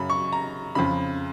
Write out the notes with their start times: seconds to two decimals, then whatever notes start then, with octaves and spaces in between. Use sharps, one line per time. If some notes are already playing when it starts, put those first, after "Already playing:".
Already playing: F#2 C#3 B5
0.10 C#6
0.32 A#5
0.75 F2 C#3 B5